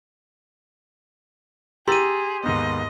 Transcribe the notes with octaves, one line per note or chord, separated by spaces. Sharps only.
G4 G#4 A#5 C6 E6 A6 D#7
D#2 G#2 B3 D#5